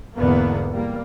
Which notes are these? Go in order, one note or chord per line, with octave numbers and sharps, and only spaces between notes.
E2 G#2 D3 A#3 B3
G3 A#3